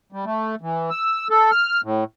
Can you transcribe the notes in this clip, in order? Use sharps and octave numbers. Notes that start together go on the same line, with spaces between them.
G3
A3
E3
E6
A4
F6
A2